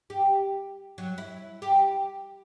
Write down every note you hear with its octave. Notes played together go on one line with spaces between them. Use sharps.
G4
F#3
E4
G4